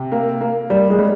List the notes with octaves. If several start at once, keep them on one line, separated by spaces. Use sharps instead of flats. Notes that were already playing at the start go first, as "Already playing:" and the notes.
Already playing: C3
A#3
A#3
G3 A#3
G#3
G3